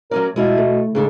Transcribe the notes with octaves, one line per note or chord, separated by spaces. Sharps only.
F#3 C#4 A#4 D5
B2 G#3 E4 F4
A3
G#2 C#3 D4 A4